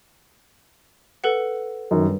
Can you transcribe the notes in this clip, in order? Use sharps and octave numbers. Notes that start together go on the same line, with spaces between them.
A4 B4 F#5
F#2 D#3
G2